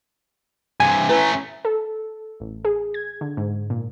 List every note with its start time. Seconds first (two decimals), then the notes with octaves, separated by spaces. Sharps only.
0.80 G2 C3 G#5
1.09 A3 C#4 E4 B4 A#5
1.65 A4
2.40 A1
2.65 G#4
2.94 G#6
3.21 D3
3.37 G#2
3.70 A#2